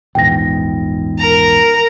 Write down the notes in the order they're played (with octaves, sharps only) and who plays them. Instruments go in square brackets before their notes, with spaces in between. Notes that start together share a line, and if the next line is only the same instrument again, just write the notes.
[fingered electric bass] A#1 E2 G#2 [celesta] G5 A#6
[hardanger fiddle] A#4 A#5